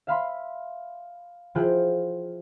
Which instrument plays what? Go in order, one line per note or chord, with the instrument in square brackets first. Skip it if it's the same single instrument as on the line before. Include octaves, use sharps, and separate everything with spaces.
[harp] E5 F5 B5 C6
F3 E4 F4 G#4 G5 F#6